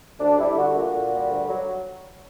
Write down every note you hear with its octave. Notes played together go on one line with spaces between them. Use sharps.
D2 D4
G3 E4
D3 F#4
A#2 F#4
A#2
G3
D2
F#3